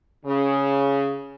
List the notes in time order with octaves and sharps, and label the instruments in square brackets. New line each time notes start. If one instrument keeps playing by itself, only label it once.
[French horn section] C#3